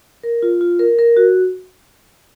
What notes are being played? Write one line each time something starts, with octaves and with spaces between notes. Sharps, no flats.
A#4
F4
F4
A#4
A#4
F#4